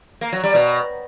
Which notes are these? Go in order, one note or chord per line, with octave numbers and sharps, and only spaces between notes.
A#3
F#3
G3
B2